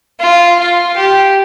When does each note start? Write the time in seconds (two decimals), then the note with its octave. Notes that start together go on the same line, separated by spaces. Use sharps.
0.20 F4
0.60 F4
0.97 G4